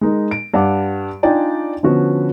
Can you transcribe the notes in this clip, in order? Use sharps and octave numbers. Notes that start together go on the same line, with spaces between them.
G#3 D#4 A#4
D7
G2 D5 F5 F#5 D6
D4 D#4 F4 D5 G5 G#5
D3 F3 B3 C#4 F#4